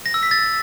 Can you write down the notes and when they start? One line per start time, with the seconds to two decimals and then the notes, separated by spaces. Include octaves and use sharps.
0.06 A#6
0.14 E6
0.23 B6
0.31 A6